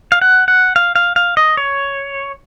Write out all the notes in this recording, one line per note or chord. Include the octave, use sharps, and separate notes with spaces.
F5
F#5
F#5
F5
F5
F5
D#5
C#5